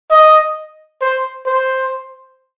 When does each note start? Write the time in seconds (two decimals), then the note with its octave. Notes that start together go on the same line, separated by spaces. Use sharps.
0.11 D#5
1.02 C5
1.47 C5